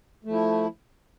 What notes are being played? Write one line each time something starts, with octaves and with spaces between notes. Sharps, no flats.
F3 A3 E4